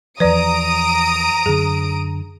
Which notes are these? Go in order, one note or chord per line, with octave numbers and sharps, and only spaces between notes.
E2 F3 B4 D5 A#5 D#6 D7
F#2 D3 G#4